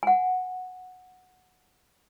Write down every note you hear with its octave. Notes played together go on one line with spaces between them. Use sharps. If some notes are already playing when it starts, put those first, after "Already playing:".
F#5 G#5